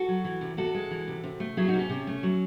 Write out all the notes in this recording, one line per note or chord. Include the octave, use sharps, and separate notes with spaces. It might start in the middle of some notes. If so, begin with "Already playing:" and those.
Already playing: F#4 A4
F#3
E3
C3
C3 F#4 A4
G#3
E3
C3
C3
A3
F#3 E4 G#4
D#4 F#4
C3
C#4
C3
A3
F#3